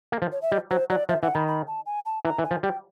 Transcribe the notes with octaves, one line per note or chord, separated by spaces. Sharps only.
A#3
F3
C#5
E5
G3 D#5
F#3 C5
F#3 D5
F3 E5
E3 F#5
D#3 B5
B5
A5
G#5
A5
E3 A#5
E3
G#5
F3
G3 G5